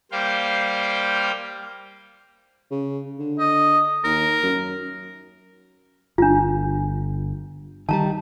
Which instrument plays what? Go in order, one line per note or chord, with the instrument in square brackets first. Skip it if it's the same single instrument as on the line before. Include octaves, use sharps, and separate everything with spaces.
[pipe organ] G3 A#3 C5 F5 G5
[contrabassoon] C#3
D3
[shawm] D#5
[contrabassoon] D#2 [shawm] A#4
[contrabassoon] F#2
[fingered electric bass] G1 [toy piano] D4 F4
[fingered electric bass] D#3 F#3 G3 [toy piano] A5 A#5